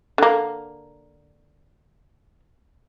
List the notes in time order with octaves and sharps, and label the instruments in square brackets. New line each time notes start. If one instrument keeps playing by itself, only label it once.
[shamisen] D3 A#3